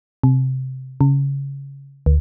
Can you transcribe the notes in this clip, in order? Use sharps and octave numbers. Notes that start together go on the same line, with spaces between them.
C3
C#3
D2